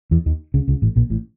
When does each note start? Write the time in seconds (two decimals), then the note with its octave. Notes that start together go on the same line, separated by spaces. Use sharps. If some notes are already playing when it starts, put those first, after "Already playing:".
0.11 E2 E3
0.26 D#2 D#3
0.54 C#2 C#3
0.68 C#2 C#3
0.82 A1 A2
0.96 A#1 A#2
1.10 A1 A2